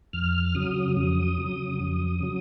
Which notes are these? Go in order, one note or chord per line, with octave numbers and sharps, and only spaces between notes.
F2 F6
C#3 F#3 D#6
F2 D#6
C#3 F#3
F2
C#3 F#3